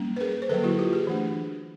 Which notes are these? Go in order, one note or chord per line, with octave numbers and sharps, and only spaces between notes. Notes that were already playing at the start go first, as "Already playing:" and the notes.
Already playing: G3 A#3 C#4
B4
G#4 A#4
C5
D3 F#3 A#3 A4 B4
E4 F#4
F4 G4
F#4 G#4
E3 A3 D4